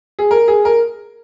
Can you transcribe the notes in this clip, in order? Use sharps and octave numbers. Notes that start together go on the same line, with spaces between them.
G#4
A#4
G#4
A#4